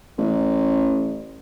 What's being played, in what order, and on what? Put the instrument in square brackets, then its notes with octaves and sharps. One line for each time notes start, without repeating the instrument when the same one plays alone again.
[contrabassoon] A1